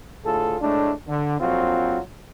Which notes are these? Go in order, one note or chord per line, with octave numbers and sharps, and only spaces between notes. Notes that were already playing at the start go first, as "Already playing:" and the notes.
D2 A2 F4 G#4 A4
A2 G#3 A3 D4
D3
A#1 F2 F#3 C4 F4 F#4